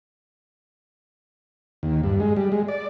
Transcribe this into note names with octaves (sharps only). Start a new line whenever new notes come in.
D#2
G2
G#3
G3
G#3
D5